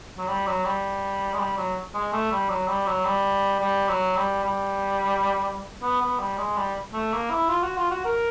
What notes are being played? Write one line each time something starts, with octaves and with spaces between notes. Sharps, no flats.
F#3
G3
F#3
G3
G#3
G3
F#3
G#3
A3
G3
F#3
G3
F#3
G3
G3
F#3
G3
G3
B3
B3
G3
G#3
G3
A3
A#3
E4
F4
F#4
F4
F#4
A#4